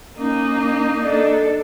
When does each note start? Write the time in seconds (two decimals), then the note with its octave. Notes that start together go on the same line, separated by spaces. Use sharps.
0.18 A#3 C#4 D#4
1.00 D4 A4 D#5